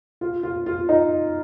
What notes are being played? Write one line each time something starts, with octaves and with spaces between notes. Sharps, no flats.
F4
F4
F4
D#4